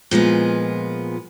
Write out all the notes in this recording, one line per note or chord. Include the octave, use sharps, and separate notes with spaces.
A#2 F3 G#3 B3